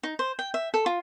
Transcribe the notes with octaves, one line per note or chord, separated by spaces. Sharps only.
D#4
C5
G5
E5
A4
F4